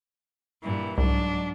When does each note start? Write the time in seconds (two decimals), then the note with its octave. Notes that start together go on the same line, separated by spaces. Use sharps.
0.63 G2 A#2 E3
0.98 C2 G#2 F#3 D4